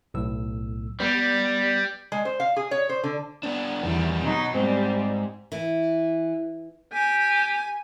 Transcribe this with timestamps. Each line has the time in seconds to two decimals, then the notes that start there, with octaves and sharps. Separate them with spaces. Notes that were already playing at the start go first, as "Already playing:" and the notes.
0.14 B1 A2 E6
1.00 G3 B3 B4 D5
2.12 G#3
2.25 C5
2.40 F5
2.57 G#4
2.71 C#5
2.89 C5
3.04 D3
3.43 B3 D4
3.83 E2 D#3 G3
4.22 B2 F#3 D#4
4.54 G#2 G3 C4
5.52 E3
6.93 G4 G#5